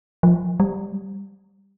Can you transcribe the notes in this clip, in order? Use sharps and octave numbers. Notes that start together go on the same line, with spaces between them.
F3
G3